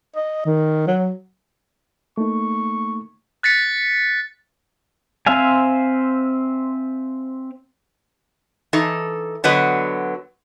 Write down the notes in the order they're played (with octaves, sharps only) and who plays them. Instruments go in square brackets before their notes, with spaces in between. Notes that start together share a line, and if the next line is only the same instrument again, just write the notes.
[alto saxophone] D#5
D#3
F#3
[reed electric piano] A3 A#3 D#4 [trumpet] C#6
[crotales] F#6 A6 B6 C#7
[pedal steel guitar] C4 C5 E5 F5 G#5
[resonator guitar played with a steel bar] E3 D#4 A4
D3 F#3 B3 B4 D#5